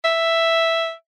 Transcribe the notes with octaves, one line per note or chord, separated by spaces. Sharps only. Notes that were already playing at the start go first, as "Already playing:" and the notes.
E5